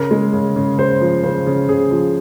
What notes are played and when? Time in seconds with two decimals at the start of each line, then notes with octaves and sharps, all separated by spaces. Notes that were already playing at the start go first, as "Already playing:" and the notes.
Already playing: C#3 A#4
0.11 G#3
0.33 C#3
0.56 C#3
0.78 C#3 C5
1.01 F3
1.24 C#3 C5
1.47 C#3
1.69 C#3 G#4
1.91 F3